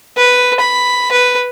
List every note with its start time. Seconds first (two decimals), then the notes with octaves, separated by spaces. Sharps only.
0.17 B4
0.60 B5
1.12 B4